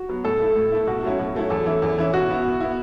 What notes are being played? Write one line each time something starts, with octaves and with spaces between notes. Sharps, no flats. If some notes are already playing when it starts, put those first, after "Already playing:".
Already playing: F#4
F#3 B3
A2 A4
A3 E4
A2
A3 E4
B2 F#4
F#3 A3 C#4 E4
B2
F#3 A3 C#4 E4
E2 A4
E3 C#4 E4
E2
E3 C#4 E4
B2 F#4
B3 E4
B2
B3 E4